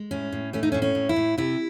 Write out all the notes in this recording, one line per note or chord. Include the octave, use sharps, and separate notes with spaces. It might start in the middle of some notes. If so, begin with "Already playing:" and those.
Already playing: G#3
A2 C#4
A2
A3 C#4
D#4
C#4
A2
C#4
A2
E4
A2
C3 E4